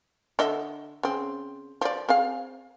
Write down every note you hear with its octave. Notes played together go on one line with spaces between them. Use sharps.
D3 D#5 E5
C#3 C4
F3 D5
C4 G#4 F5